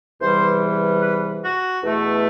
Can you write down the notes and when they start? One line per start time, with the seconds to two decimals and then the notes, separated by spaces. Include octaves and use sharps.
0.21 E2 C3 E3 G3 C5
1.01 B4
1.42 F#4
1.82 E2 B2 A3